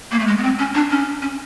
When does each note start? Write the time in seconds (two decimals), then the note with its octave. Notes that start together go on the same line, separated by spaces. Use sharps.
0.11 A#3
0.19 A3
0.27 G#3
0.38 B3
0.43 C4
0.59 C#4
0.75 D4
0.91 C#4
1.22 C#4